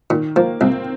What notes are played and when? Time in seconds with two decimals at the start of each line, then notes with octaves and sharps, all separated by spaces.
0.10 A#2 D#3
0.36 F3 A#3
0.61 C2 C4